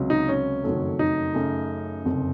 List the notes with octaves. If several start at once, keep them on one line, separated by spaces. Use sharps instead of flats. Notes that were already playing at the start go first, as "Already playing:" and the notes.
Already playing: C#2 C3 F#3
D#4
C#4
F#1 F2 D#3 F#3 A3
D#4
F#2 C#3 A3
F#1 F2 C3